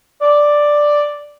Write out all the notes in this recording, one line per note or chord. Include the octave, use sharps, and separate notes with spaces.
D5